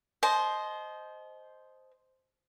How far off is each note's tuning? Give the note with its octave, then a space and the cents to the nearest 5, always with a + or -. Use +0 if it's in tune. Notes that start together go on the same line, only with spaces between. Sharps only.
C5 +0 D#5 +0 A5 -40